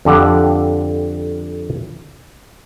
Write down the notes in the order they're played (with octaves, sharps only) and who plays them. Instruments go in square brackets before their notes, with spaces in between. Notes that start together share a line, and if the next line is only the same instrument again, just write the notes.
[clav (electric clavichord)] F2 D3 G4 F#5